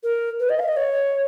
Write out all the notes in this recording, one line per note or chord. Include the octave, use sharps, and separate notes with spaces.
A#4
B4
D#5
F5
D#5
C#5